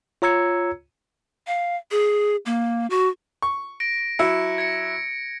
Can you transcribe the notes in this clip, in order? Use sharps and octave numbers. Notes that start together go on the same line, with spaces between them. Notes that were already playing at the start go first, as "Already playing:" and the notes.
F4 C#5 A#5 E6 G#6 C#7
F5
G#4
A#3
F#4
C#6
A#6 D7
F#3 E4 C#7
G#6 A#6 C#7